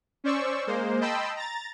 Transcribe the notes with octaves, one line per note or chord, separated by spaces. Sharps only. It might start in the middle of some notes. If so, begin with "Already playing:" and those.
C#4 C5 D5 C#6 E6
G#3 A#3 C5
D#5 G5 A5 B5 C6 E6
A#5 A6